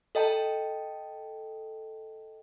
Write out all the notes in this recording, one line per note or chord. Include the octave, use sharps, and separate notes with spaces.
A4 D#5 G5 A5